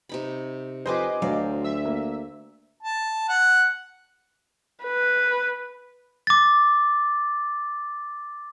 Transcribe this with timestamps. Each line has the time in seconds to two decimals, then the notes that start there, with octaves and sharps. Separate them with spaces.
0.09 C3 D#4 B5
0.86 F2 G4 B4 C5 D#5 G#5 C6 D6
1.22 D2 F#3 C5 D5 F5
1.64 E5 E6
1.85 A#3
2.83 A5
3.28 F#5
4.84 B4
6.27 D6 A6